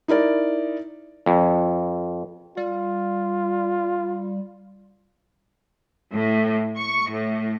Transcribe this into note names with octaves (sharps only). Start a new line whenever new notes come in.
D#4 E4 A#4 D5
F2
G3 F4
A2
C#6
A2